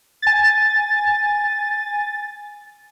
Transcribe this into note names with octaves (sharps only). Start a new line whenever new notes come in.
G#5 A6